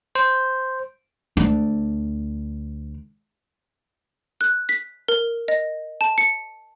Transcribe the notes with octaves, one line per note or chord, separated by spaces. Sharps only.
C5
D2 D4
F#6
B6
A#4
D#5
A5
C#7